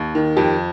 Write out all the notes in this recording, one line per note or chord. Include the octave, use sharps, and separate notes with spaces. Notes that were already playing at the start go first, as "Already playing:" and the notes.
Already playing: D#2
D#3
F2 G4